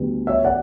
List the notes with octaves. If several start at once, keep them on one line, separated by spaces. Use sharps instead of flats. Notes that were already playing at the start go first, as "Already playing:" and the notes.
Already playing: D2 D3 G3 B3
C#5 E5
D5 F#5